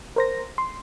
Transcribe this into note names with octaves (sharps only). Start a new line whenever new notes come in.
A#4 C5 A#6
C6